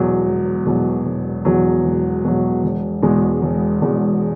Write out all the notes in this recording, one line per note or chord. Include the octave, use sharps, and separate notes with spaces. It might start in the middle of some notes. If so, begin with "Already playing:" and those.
Already playing: E1 E2 B2 F#3
E1
E2 B2 F#3
E1
E2 B2 F#3
E1
E2 B2 F#3
E1
E2 B2 G#3
E1
E2 B2 G#3